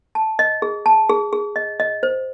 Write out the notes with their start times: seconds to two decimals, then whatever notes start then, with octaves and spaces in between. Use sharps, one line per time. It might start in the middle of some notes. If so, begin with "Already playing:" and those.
0.15 A5
0.39 D#5
0.62 G#4
0.86 A5
1.10 G#4
1.33 G#4
1.56 D#5
1.80 D#5
2.03 C5